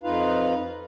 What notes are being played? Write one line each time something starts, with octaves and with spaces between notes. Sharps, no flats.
F2 D#4 F4 B4 F5